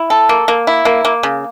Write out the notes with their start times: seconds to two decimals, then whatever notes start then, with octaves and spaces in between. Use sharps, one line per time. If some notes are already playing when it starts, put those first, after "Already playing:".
Already playing: E4
0.10 A4
0.29 A#3
0.48 A#3
0.67 E4
0.85 A#3
1.05 A#3
1.23 C#3